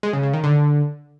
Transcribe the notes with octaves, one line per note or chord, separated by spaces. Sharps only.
G#3
C#3
C#3
D#3
D3